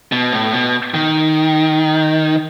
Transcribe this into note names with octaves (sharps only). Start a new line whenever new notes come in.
B2
A2
B2
D#3